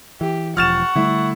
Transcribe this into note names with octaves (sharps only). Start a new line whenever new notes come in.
E3 G4
E1 C#2 F3 F#5 C#6 F6 A6 E7
D3 G3 A3 E4